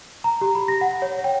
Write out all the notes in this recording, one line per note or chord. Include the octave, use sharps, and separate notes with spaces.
A#5
G4
B5
A#6
F#5
C#5
G5